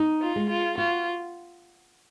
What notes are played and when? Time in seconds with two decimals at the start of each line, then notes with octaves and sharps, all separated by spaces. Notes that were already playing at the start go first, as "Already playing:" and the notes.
Already playing: D#4
0.22 F4
0.36 G#3
0.49 F4
0.77 F4 F#4